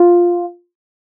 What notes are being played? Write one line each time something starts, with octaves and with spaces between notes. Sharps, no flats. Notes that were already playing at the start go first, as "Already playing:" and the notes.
Already playing: F4